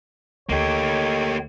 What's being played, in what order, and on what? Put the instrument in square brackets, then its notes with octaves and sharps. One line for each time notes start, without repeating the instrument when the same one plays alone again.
[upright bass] D2 [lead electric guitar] A#3 G4 [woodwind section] D#4 A4 C#5